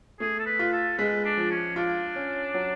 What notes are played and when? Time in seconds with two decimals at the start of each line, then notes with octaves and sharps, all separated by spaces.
0.20 A3 G#4
0.39 A4
0.46 B4
0.59 F4
0.72 A4
0.98 G#3 B4
1.25 D4
1.37 F3
1.51 C#4
1.76 D4 F4
2.16 C#4
2.54 F#3